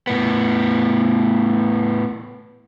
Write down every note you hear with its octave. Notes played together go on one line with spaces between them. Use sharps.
A2 B3